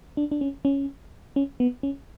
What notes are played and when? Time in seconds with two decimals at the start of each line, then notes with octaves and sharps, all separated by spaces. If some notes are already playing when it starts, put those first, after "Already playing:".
0.17 D4
0.31 D4
0.41 C#4
0.65 C#4
1.36 C#4
1.60 B3
1.83 C#4